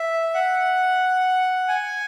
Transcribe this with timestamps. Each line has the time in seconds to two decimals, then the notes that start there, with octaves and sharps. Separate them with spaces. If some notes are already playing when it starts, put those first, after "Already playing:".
Already playing: E5
0.34 F#5
1.68 G#5